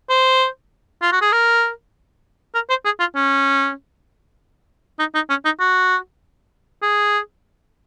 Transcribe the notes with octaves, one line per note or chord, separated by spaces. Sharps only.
C5
F4
F#4
G#4
A#4
A#4
C5
G#4
F4
C#4
D#4
D#4
C#4
D#4
F#4
G#4